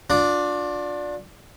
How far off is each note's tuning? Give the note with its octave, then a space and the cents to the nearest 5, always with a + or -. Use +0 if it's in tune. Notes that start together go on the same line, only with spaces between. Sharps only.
D4 -5 F4 +40